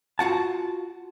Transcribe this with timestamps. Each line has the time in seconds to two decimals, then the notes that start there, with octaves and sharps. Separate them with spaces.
0.19 F4 F#4 F#5 A5